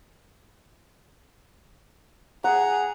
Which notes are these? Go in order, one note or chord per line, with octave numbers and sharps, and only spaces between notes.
G#4 F#5 A#5